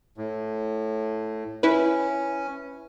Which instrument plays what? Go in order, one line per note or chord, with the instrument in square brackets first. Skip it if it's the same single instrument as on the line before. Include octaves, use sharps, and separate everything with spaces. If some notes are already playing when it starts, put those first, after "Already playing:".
[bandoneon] A2
[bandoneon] C#4 [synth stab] E4 B4